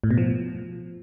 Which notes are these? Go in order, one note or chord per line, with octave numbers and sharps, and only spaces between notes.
A2
B2
F3